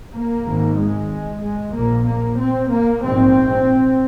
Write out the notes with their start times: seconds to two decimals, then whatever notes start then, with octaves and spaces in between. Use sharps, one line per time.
0.13 A#3
0.45 G#1 G#2
0.78 G#3
1.42 G#3
1.73 A#1 A#2 A#3
2.06 A#3
2.38 C4
2.71 A#3
3.02 A#1 G#2 C4